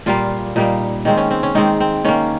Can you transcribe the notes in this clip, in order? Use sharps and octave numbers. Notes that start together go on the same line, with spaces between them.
A#2 G3 A#3 F4
A#2 G3 A#3 D#4
D#3 G#3 C4 C#4
C#4
C4
C#4
D#3 G#3 C4 D#4
C4
D#3 A#3 C#4